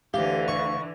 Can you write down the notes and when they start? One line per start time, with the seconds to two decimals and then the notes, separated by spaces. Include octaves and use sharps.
0.14 D2 D3 E3 G4 F5
0.48 C#6